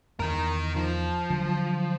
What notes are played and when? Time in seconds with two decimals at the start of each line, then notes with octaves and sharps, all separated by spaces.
0.20 E2 D#3 A#4
0.76 F3
1.30 D3 F#3